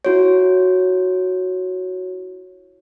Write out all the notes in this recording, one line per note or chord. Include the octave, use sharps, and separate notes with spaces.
E4 F#4 C#5